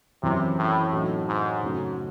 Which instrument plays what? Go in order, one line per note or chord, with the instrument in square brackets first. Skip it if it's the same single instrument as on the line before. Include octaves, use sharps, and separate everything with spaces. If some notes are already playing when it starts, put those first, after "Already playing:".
[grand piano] F#2 E3 C4 E4 [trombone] C3
[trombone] A2
[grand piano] A2 F#3 A3 D#4 F#4
[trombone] G#2
[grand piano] F#2 C#3 F#3 A3